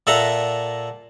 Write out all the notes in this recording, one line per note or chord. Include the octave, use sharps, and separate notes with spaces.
A#2 A4 E5 F#5 A#5